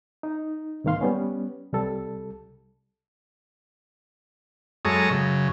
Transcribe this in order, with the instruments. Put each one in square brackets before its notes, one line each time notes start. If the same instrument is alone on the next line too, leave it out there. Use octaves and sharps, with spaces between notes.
[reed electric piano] D#4
C2 G#2 D#3 A#3 F5 C6
G3 B3 C#4
C2 G3 A4
[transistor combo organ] F#2 G#3 A4 C#5 A#5 D#6
F#2 C#3